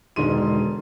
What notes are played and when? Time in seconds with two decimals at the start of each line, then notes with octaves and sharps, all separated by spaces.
0.16 E1 D3 D#3 G#3 C6 D#7